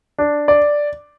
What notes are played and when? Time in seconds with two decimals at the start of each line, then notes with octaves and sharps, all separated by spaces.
0.19 D4
0.48 D5